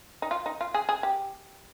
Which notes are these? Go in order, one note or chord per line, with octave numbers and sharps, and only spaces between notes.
D#4
F4
D#4
F4
G#4
G#4
G4